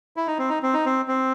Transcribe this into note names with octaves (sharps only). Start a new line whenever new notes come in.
E4
D#4
C4
D#4
C4
D#4
C4
C4